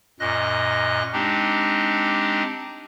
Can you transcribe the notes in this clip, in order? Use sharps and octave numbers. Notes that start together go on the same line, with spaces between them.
F#2 A#2 D#5 F#6 A#6
G#3 C4 D4 D#4 G4